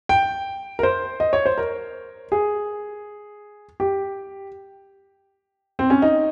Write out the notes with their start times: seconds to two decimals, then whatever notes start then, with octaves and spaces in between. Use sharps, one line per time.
0.09 G5
0.79 A#4
0.83 C5
1.20 D#5
1.33 C#5
1.46 C5
1.58 A#4
2.32 G#4
3.80 G4
5.79 C4
5.90 C#4
6.02 D#4